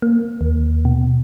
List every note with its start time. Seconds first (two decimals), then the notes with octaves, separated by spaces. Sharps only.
0.02 A#3
0.41 D#2
0.85 B2